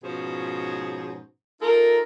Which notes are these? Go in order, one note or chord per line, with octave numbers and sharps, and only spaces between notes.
G#2 B2 F3 C#4 G#4 C5
D#4 F4 A4 A#4